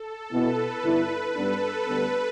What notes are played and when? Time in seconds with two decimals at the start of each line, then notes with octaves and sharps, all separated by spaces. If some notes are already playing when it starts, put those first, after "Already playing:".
Already playing: A4
0.31 B2 B3 E4 B4
0.84 G2 D3 B3 E4
1.35 G2 G3 B3 D4 A4
1.88 D2 D3 G3 B3 B4